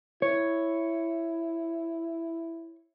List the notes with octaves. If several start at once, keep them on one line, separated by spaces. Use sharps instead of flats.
E4 C#5